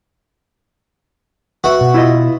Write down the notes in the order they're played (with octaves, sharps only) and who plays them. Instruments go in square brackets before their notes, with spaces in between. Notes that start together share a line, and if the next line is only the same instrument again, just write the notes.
[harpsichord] F#4 [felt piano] B4 E5
[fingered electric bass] B2
[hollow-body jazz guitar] E4 F4 D#5